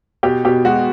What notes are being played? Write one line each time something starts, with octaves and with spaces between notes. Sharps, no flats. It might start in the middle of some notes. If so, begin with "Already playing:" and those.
B2 G4
B2 G4
G#3 F#4